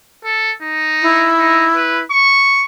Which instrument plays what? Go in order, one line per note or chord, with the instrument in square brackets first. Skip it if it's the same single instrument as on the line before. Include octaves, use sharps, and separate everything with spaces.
[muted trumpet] A4
D#4
[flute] E4
[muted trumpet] D#4
B4
C#6